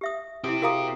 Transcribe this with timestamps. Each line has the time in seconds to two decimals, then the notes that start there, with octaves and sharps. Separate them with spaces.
0.01 G4 E5 D#6
0.44 C4 E4 G4 D#6
0.62 F#4 G#4 A#4 F5 A#5 D#6